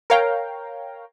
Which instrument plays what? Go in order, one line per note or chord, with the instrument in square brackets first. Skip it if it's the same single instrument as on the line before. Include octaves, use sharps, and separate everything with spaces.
[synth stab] A#4 C#5 F5 G5 A#5